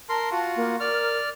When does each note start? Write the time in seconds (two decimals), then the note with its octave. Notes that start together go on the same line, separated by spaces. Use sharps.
0.09 A#4 A5 C6
0.31 F4 F#4
0.56 A#3
0.80 A#4 D5 F6